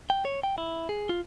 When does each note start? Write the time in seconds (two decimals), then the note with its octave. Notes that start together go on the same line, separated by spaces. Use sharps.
0.10 G5
0.25 C#5
0.43 G5
0.58 E4
0.89 G#4
1.09 F4